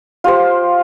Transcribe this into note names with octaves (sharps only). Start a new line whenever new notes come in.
F4 G4 C5